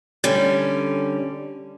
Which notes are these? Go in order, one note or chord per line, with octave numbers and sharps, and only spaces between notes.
D3 G3 C#4